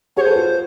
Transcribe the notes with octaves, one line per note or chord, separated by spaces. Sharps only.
F#4 G#4 C5 C#5
A4 B4
F4